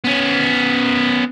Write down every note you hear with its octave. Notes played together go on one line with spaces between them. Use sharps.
B3 C#4